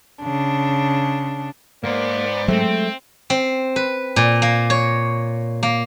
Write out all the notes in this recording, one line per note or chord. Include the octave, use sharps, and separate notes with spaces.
C#3 D4
G#2 A#3 B3 C5 D5
F#3 G#3 A3 C4
C4
B4
A#2
A#3
C#5
A#3